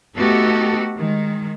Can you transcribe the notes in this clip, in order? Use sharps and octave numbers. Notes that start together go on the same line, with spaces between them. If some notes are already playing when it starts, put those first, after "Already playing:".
A3 B3 D#4 F#4 G4 A4
D#3 G#3